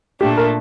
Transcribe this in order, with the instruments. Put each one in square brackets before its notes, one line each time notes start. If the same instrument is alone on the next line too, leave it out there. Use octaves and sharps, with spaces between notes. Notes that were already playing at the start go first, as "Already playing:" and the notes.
[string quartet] A#2 A3 D4 [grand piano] G4
[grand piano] A#4